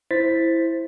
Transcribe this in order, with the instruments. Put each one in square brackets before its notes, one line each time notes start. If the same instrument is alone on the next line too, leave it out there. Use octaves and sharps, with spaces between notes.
[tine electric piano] E4 C5 A6 B6